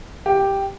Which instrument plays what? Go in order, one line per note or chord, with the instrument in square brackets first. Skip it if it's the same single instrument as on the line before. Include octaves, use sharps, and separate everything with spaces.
[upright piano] G4